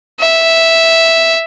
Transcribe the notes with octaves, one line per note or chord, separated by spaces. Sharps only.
E5